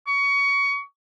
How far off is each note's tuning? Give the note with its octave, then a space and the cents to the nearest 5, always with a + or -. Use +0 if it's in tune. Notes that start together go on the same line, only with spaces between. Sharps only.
C#6 +25